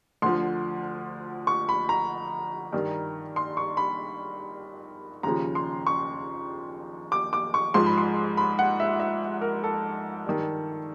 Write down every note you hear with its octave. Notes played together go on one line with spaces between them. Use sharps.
D2 D3 F3 C6
C#6
B5
A#5
G2 D#3
C6
C#6
B5
D#2 C#3 F3 A#5
C6
C#6
D6
D6
C#6
G#2 F3 C6
B5
C6
B5
F#5
E5
E5
A#4
A4
G2 D#3